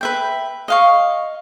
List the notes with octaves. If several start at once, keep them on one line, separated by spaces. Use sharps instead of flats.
B4 E5 G5
D#5 F5 C#6